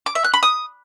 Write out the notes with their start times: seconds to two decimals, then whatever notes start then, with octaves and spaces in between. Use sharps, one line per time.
0.06 D6
0.15 E5
0.24 F#6
0.34 B5
0.43 D#6